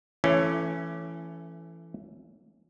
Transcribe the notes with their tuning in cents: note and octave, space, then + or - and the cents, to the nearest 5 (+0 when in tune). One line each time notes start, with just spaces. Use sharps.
E3 +25 A3 +0 C#4 +0